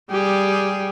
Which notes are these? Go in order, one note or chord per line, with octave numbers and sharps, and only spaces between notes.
G3 G4 G#4